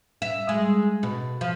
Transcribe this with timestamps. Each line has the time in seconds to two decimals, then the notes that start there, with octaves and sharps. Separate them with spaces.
0.22 E5
0.49 G#3
1.03 B2
1.41 F3